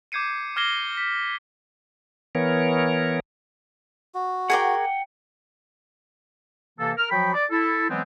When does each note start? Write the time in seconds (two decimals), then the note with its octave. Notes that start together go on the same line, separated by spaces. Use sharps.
0.12 D6 G6 G#6 C7 C#7 D#7
0.56 D6 F6 G#6 A#6 C7 G7
0.97 B6
2.35 E3 B3 A#4 C#5
4.15 F#4
4.50 G#4 A#4 F#5 G5 D6
6.78 C3 E3 A#3 A4
6.97 A#4 F6
7.11 F3 F#3 F#4 G5 B5
7.34 D5
7.50 E4 A4
7.88 E3 F#3 G#3 B3 C4